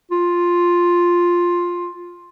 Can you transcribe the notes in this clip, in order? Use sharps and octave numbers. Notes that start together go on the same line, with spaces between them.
F4